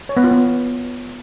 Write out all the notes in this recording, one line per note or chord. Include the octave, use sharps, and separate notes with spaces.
C#5
B3
F4
B3